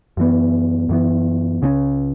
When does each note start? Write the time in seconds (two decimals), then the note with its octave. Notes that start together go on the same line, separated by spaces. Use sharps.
0.17 F#2 E3 B3
0.89 F#2 E3 B3
1.62 C#2 C#3 F#3 C#4